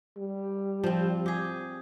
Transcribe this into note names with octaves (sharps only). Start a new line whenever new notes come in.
G3
F3 C4
G4 G#4